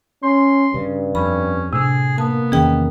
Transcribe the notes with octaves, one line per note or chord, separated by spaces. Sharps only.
C#4 C6
G2 C#3
F2 C#4 B5
A2 C3 D4 G#4
A#3 B3 A5
E2 D#3 C#4 G#4 D#5 G5